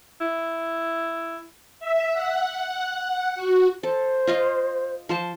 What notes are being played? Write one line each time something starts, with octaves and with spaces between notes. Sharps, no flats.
E4
E5
F#5
F#4
A4 C5
F4 D#5 F5
F3 C5 A5